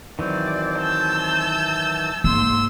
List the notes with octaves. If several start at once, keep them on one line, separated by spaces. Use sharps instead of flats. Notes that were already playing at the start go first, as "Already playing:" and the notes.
D#3 E3 F#3 C4 D5
A5 E6 G6
G#2 A#3 C6 E6